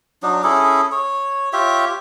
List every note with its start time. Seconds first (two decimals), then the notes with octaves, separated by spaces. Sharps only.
0.23 F#3 D4 D#4
0.44 C#4 E4 G#4 A4
0.92 C#5
1.53 F4 G4 C#5 E5